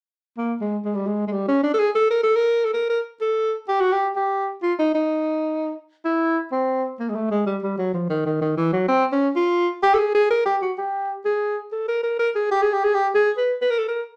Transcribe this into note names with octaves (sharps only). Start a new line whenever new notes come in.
A#3
G#3
G#3
G3
G#3
G#3
G3
C#4
D4
A4
G#4
A4
A#4
A4
A#4
A4
A#4
A#4
A4
G4
F#4
G4
G4
F4
D#4
D#4
E4
C4
A#3
G#3
A3
G#3
G3
G3
F#3
F3
D#3
D#3
D#3
E3
F#3
C4
C#4
F4
G4
A4
G#4
G#4
A#4
G4
F#4
G4
G#4
A4
A#4
A#4
A#4
G#4
G4
G#4
G4
G#4
G4
G#4
B4
B4
A#4
A4
A#4